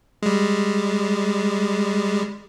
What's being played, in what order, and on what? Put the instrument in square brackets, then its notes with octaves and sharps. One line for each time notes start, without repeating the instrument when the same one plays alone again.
[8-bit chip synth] G3 G#3